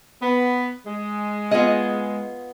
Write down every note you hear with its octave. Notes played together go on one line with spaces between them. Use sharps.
B3
G#3
B3 F4 G#4 D#5